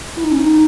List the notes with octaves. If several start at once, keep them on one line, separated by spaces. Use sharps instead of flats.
E4
D#4
C#4
D#4